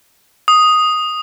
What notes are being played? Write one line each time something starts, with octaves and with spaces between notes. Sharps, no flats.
D#6